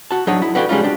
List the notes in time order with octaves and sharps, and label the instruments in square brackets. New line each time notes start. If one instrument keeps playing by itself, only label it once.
[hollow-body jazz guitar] F#4 A5
F#3 D4 D#4 G#4 C#5
E4
F#4 A4 B4 D5 F5 G5
G3 G#3 C#4 D#4 F4
D4 G4